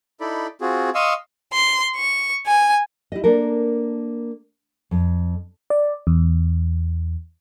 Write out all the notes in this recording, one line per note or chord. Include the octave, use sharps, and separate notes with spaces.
D#4 E4 A4 D5 B5
C4 F4 F#4 G#4
D#5 F5 C6 C#6 D#6 E6
C6
C#6
G#5
E4 G4 D#5
A#3 D4 A4 A#4
F2
D5
E2